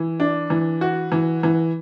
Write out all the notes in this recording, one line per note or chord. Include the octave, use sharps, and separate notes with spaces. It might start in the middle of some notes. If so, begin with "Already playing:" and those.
Already playing: E3
D4
E3
F#4
E3
E3